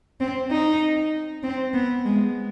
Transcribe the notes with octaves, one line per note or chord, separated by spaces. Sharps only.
C4
D#4
C4
B3
G#3